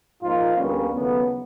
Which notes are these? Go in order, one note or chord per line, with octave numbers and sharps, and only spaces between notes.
G#2 F3 A#3 D#4 F4
D2 D3 G3 A#3 B3 C#4
D#2 C#3 F#3 A3 B3